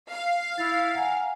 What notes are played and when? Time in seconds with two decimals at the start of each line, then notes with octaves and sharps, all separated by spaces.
0.10 F5
0.58 E4 A6
0.95 F#5 G#5 A#5